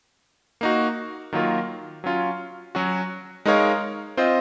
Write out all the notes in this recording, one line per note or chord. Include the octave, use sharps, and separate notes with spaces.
A#3 D#4 F#4
D#3 F#3 A#3 F4 A#4
F#3 C#4 F4
F#3 C#4 F#4
G#3 D#4 A#4 C#5 F5
C4 F4 C5 D#5